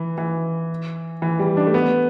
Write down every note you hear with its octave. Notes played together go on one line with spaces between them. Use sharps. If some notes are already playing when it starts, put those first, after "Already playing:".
Already playing: E3
E3
E3
G3
D4
A3
B3